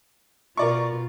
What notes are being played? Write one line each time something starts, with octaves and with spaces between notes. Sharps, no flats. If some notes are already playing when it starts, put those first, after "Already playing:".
B2 F4 A#4 D5 C#6